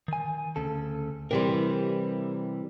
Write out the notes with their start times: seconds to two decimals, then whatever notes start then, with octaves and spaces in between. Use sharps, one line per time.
0.08 D#3 G#5
0.56 D2 C#3 A4
1.31 C3 E3 G3 A#4 C6